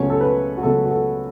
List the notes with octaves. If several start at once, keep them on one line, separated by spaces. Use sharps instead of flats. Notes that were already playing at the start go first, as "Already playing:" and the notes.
Already playing: C#2 B2 F#3 A3 C#4 C#5
A4
B4
F#4
C#2 B2 F#3 A3 C#4 A4
F#4
A4